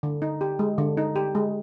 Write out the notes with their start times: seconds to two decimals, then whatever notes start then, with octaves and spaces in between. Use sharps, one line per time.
0.03 D3
0.22 D#4
0.41 G4
0.59 G#3
0.78 D3
0.97 D#4
1.16 G4
1.35 G#3